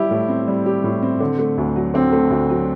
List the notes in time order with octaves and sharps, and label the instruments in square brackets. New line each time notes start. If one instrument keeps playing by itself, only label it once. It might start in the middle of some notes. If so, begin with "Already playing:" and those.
Already playing: [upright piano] G3 G4 [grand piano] E4
[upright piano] A2
C4
G3
G4
A2
C4
D3
A3
D2
F#3
[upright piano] D3 [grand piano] C4
[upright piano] A3
D2
F#3